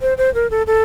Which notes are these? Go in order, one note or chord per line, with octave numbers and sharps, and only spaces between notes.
C5
C5
A#4
A4
A4